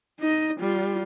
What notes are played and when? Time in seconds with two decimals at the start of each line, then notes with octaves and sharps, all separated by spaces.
0.20 D#4 D#5
0.60 G3 F4